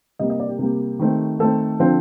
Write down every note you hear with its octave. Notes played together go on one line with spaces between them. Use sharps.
C3 G3 A#3 D#5
D#5
D5
G4
C3 G3 A#3
D#3 A3 C4
D#3 A3 C4 A4
D3 F3 C4